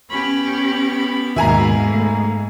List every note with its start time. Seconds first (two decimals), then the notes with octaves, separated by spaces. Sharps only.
0.10 B3 C#4 G4 B5
1.36 D#2 G#2 B2 D#3 A#3 E5 G#5 A#5
1.89 A3